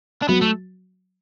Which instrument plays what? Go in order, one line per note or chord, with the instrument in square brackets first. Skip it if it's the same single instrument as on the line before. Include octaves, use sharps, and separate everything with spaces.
[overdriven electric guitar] D4
[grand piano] F#3 [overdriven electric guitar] B3
[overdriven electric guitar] A3